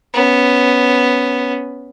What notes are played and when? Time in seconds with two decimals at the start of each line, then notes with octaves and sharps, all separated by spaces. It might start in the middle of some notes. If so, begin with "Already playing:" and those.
0.14 B3 C#4